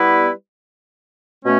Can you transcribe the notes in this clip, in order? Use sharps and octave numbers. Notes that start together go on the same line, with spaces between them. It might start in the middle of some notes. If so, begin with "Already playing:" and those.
Already playing: G3 B3 E4 B4
B2 A3 C#4